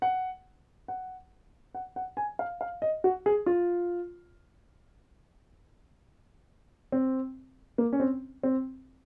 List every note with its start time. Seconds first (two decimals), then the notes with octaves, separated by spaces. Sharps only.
0.02 F#5
0.88 F#5
1.75 F#5
1.96 F#5
2.17 G#5
2.39 F5
2.61 F5
2.82 D#5
3.04 F#4
3.26 G#4
3.46 F4
6.92 C4
7.78 A#3
7.93 C#4
8.00 C4
8.43 C4